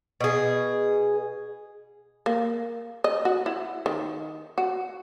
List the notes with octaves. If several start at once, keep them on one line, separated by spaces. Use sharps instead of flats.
B2 G#4
A#3
D#5
F#4
E4
D#3
F#4